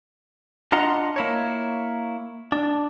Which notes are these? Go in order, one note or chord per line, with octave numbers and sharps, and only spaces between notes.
D4 F4 D#5 F#5 A#5 C6
A#3 E4 C#5
D4